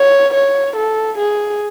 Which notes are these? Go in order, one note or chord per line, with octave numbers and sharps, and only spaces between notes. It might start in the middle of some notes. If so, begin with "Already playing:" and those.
Already playing: C#5
C#5
A4
G#4